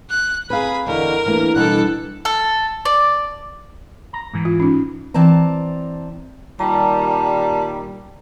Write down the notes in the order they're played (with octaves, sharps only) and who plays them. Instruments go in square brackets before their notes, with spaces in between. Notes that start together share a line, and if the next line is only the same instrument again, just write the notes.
[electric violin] F#6
[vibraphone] C4 A#5 [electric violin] G#4 B5 [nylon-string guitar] B4 F5
[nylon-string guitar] E2 D3 [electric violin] A#4 [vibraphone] D#5 F#5 C#6
[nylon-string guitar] E3 A3 A#3 [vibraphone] D4 B4
[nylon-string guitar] B2 E3 B3 [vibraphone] G3 D4 [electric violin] A4 F#6
[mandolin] A4
D5
[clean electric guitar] A#5
G#2 E3
[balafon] F4
C#4 D#4
[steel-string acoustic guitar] E3 C4 D5 A5 A#5
[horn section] A#2 D#3 G3 [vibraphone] A5 A#5